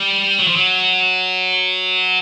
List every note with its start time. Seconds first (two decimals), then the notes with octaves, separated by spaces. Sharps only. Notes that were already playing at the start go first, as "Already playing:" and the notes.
Already playing: G3
0.39 F#3
0.47 F3
0.56 F#3